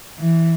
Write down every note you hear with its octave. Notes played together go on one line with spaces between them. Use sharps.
E3